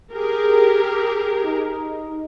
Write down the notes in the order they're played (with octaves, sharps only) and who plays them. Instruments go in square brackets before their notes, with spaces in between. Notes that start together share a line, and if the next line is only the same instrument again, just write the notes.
[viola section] G4 G#4 A#4
[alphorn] D#4